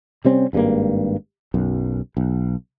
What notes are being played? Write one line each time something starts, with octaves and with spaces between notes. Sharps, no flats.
C3 G3 C4 C#4
G#1 G2 G#3 A#3
B1 F#2
B1